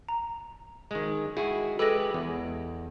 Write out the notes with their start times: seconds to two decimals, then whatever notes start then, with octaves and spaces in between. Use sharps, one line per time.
0.09 A#5
0.91 D#3 G#3
1.37 E4 F#4 G#4
1.79 G#3 G4 A4 B4 A#6
2.14 E2